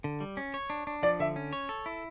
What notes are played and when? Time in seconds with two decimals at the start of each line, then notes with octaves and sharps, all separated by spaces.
0.04 D3
0.20 G3
0.37 C#4
0.54 C#5
0.70 D4
0.87 D4
1.03 F3 D5
1.20 D3 E5
1.36 C#4
1.53 C#5
1.69 A4
1.86 E4